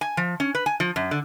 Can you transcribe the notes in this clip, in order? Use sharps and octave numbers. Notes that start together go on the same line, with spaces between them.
G#5
F3
C#4
B4
G#5
F3
F#2
D3